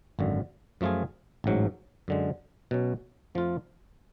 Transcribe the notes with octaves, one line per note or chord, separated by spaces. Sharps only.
G#1 F#2 D3
F#2 F3 A3 F4 G#4
A1 G#2 F#3
F#2 D3 G#3
B2 F#3 C#4
F2 F3 A3 F4